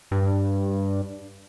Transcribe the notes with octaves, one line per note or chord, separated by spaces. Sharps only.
G2